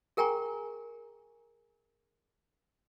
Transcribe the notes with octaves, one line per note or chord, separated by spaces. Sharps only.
G#4 A#4 G5 G#5 A#5 C#6